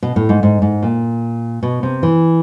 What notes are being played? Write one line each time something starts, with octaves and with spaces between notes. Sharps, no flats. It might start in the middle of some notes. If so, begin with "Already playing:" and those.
B2
A2
G#2
G#2
G#2
A#2
B2
C3
E3